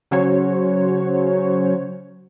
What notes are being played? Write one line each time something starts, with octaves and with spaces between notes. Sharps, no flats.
C#3 F#3 C#4 F#4 C5 C#5